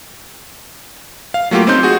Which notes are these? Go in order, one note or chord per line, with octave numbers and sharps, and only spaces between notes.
F5
F#3 A3 A#3 F4 G4
C4 C#4 D#4 C6 G6
F#4 G#4